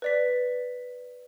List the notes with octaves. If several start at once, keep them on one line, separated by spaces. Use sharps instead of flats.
B4 D5 B6